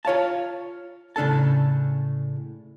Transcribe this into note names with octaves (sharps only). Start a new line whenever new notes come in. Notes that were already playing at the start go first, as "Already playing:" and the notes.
F4 C#5 F5 A5
A2 C#3 D4 A4 A5